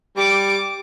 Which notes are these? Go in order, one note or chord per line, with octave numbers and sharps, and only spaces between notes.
G3 D6